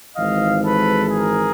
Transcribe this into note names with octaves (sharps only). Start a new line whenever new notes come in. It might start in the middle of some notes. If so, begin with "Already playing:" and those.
G#1 G#2 E3 D#5 F5
A4 B4
G#4 A#4